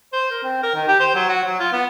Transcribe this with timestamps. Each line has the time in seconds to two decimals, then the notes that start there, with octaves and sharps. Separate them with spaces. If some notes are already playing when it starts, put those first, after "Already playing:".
0.13 C5
0.30 A#4
0.43 C4
0.63 A#4
0.75 D#3
0.88 G4
0.99 C5
1.15 F#3
1.29 F#4
1.44 F#3
1.60 F4
1.72 B3